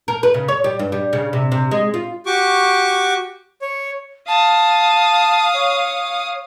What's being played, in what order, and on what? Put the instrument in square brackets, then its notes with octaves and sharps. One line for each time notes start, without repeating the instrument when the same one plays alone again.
[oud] A#4
B4
C#3
C#5
G3
G2
G3
C#3
C3
C3
G#3
F4
[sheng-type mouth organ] F#4 G4 C#6 D6
C#5
[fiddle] F5 D#6 [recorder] A5
[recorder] C#5